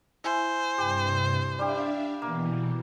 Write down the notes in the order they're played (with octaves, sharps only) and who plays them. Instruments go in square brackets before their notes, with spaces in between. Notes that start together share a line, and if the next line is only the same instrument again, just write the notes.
[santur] E4 G#5 [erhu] C5
[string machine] G2 C3 [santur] G4
[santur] G3 G4 [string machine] D4 E5 F5
[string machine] B2 E3 [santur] A#3